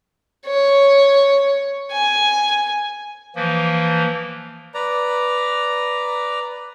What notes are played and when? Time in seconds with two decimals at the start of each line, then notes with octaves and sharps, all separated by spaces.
0.46 C#5
1.91 G#5
3.36 E3 F3 A#3
4.74 B4 D5 A#5